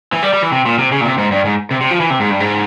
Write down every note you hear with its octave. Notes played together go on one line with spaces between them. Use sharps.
E3
G3
G3
E3
C3
A#2
C3
C#3
A#2
C3
G#2
G2
G#2
C3
C3
F3
E3
C3
G#2
G2
G#2